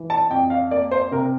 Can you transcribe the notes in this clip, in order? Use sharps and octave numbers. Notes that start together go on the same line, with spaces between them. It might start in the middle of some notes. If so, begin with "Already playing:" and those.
Already playing: E3
A5
F2 G5
F5
A#3 D5
C5
C3 A#4